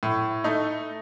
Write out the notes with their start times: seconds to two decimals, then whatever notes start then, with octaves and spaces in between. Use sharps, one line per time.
0.03 A2
0.44 A3 D#4